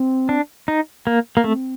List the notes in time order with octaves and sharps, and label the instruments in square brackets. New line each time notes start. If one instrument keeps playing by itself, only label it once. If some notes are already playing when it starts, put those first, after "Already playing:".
Already playing: [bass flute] C4
[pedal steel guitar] D4
D#4
A#3
A#3
[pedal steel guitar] A3 [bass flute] C4